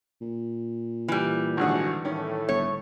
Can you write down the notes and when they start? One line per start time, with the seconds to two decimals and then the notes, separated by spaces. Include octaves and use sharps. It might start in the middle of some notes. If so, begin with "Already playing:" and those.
0.22 A#2
1.08 E3 G3
1.57 G#1 D3 F#4 G#4 F#5
2.05 A2 D#3 A3 C#4
2.49 G1 C#5